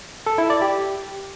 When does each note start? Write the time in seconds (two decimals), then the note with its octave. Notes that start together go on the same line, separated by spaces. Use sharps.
0.26 A4
0.38 E4
0.50 D5
0.62 G4